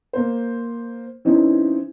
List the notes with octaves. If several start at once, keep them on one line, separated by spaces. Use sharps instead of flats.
A#3 C5
E3 C4 C#4 D#4 E4